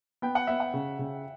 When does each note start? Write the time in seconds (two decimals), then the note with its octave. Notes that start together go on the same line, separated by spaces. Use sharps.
0.22 B3 G5
0.35 F#5
0.47 B3 E5
0.60 F#5
0.74 C#3
0.99 C#3